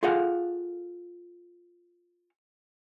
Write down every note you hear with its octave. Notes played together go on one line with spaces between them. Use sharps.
F4 G#4 A4 F5 F#5